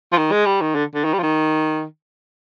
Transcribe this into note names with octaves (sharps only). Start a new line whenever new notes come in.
F3
D#3
G#3
G3
D#3
D3
D3
D#3
G3
F3
D#3